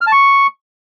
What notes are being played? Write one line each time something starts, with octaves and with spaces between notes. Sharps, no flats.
F6
A5
C#6